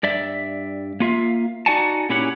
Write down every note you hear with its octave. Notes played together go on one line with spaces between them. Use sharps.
G2 D5 E5
A#3 F4 E5 F5
D#4 F#4 D5 F#5 G#5 A5
A#2 C#4 E4 G4 C#5 F#5